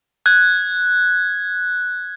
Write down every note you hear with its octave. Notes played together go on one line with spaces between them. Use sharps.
F#6 G#6